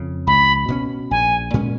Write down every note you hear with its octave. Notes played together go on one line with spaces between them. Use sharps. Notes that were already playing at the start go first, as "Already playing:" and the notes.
Already playing: F2 C#3
C#2 B5
B2 G#3 C#4
A#1 G#5
A#2 G#3 C#4